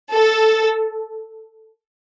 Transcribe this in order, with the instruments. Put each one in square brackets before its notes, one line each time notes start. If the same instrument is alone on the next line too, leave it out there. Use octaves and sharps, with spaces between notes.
[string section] A4